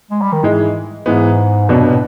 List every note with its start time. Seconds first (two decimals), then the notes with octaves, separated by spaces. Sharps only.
0.11 G#3
0.22 G3
0.33 D#3
0.43 G#2 E3 G#3
1.06 G#2 E3 G#3 B3
1.69 C2 F#2 B2 F#3 B3 D4
1.80 G2
1.90 A2